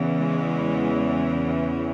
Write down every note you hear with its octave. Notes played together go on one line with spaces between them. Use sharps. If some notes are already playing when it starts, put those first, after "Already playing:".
Already playing: E2 C#3 E3
G#3